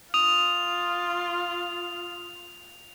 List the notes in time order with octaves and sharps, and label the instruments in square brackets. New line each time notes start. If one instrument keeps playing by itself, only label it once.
[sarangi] F4 [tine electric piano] D#6 [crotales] F7